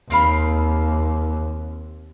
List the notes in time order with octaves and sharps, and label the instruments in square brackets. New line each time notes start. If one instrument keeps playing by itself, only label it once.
[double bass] D#2 [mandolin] C4 F5 B5